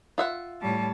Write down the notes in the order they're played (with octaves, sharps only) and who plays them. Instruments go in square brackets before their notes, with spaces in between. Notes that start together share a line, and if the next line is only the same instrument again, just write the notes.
[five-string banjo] F4 E5 F#5
[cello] A2 G3 [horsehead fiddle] C#5 A5